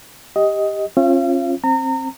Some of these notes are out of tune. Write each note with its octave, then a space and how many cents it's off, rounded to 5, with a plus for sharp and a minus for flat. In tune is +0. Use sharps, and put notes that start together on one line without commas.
G4 +10 D#5 +10
C#4 -40 F4 +0 F5 -40
C4 +20 A#5 -30